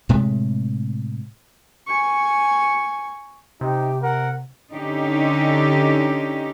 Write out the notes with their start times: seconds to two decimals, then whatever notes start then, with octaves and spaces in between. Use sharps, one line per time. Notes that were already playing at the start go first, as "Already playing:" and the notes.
0.09 A2 C3 G#3 A3
1.87 G#5 C#6
3.61 C3 D#4 G4
4.02 A#4 F#5
4.72 D3 C#4 D#4 G4